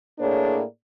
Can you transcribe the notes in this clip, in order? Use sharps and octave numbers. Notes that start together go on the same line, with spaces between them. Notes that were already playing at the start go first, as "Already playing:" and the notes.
A2 A#3 D4 G#4 C#5 D5